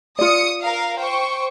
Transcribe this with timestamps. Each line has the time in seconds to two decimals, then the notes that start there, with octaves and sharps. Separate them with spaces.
0.19 F4 D5 D#6 C#7
0.60 A#4 F5
0.98 C5 G5 C#6